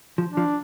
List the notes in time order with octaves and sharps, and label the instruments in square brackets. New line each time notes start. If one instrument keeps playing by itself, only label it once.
[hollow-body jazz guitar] F3
[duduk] D4
[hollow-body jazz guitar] F3